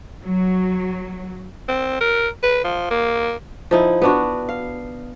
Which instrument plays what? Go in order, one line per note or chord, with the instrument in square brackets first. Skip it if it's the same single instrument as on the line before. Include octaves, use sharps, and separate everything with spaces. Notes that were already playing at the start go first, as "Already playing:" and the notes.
[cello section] F#3
[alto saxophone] C4
A#4
B4
F3
A#3
[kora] F3 D#4 E4
B3 D4 F#4
F5